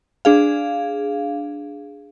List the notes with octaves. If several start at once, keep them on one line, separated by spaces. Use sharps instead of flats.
D4 G#4 F5